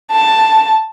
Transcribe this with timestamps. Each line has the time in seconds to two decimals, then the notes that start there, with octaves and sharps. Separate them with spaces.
0.12 A5